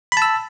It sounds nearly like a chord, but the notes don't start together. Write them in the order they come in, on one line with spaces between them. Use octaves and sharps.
B5 A5 E6